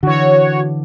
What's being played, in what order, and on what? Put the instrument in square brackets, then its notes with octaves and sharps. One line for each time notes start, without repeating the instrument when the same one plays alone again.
[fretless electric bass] D3 E3 [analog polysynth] F#4 C#5